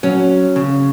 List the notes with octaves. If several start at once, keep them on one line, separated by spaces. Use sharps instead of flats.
F#3 C#4
C#3